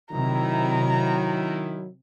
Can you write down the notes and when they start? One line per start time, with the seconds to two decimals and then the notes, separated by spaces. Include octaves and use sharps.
0.12 C3 D#3 F#3 E4 A#5